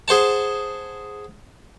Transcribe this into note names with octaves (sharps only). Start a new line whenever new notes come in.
G#4 C5 F#5 A5